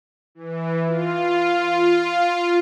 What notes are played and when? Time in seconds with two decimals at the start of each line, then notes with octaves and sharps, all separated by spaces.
0.35 E3
0.87 F4